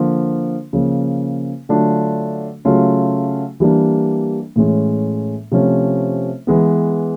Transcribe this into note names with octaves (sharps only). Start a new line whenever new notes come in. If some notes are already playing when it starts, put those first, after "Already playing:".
Already playing: D3 F3 A#3
C#3 F3 A#3
D3 F#3 A3 D4 F4
C#3 F#3 A3 C#4 F4
E3 G3 A#3 D4
A2 E3 G#3 C#4
C3 F3 A3 C#4
E3 G#3 B3